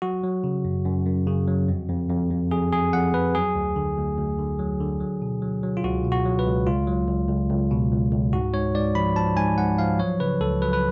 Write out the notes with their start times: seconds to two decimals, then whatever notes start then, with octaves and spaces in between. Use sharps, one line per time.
0.02 F#3 F#4
0.23 F#3
0.44 C#3
0.65 F#2
0.85 F#2
1.06 F#2
1.27 C#3
1.47 F#3
1.68 F2
1.89 F2
2.10 F2
2.30 F2
2.51 F2 G#4
2.72 F2 G#4
2.93 F2 F#5
3.14 F2 B4
3.35 F#3 G#4
3.55 D2
3.76 D3
3.97 D2
4.18 D2
4.39 D3
4.59 F#3
4.80 D3
5.01 F#3
5.22 B2
5.42 F#3
5.63 F#3
5.77 F4
5.84 C#2 F#4
6.05 B2
6.12 F#4
6.25 F#3
6.39 B4
6.46 C#2
6.67 C#2 F4
6.87 F#3
7.09 C#2
7.29 C#2
7.50 C#2
7.71 B2
7.92 C#2
8.13 C#2
8.33 G#2 F#4
8.54 G#2 C#5
8.74 G#2 D5
8.95 F3 B5
9.16 F3 A5
9.37 G#2 G#5
9.58 G#2 F#5
9.78 F3 F5
9.99 F#3 C#5
10.20 C#3 B4
10.41 C#2 A4
10.62 F#3 B4
10.73 B4